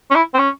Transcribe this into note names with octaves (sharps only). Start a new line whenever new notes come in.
C#4
E4
C4
C#4